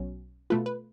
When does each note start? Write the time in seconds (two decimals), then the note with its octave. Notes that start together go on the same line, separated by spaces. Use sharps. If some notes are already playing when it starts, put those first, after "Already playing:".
Already playing: B1 B2 F#3 C#4
0.50 B2 A3 F4 B4
0.66 B4